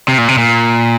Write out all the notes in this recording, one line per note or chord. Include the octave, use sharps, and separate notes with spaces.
C3
A#2
C3
A#2